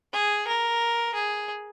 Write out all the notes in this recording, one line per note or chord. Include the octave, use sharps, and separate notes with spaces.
G#4
A#4
G#4